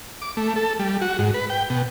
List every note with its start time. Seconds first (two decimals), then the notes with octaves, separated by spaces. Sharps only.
0.22 D6
0.37 A3
0.56 A4
0.79 G3
1.02 F#4
1.19 G#2
1.34 B4
1.50 G5
1.70 B2